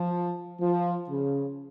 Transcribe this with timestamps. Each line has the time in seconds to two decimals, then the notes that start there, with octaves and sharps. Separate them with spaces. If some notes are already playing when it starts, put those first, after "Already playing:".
Already playing: F3
0.61 F3
1.08 C#3